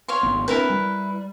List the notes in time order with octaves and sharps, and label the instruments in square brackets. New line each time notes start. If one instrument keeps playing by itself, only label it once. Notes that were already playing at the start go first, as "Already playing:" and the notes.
[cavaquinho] C#5 F5 C6
[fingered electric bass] G#1 B3
[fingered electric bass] C4 D4 [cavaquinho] E4 A#4 B4
[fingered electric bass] G3